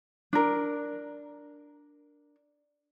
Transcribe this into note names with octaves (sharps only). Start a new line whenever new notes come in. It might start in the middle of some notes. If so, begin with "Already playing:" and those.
D4 A#4